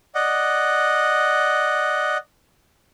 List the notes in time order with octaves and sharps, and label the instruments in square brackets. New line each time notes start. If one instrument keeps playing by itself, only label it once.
[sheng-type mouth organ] D5 D#5 F#5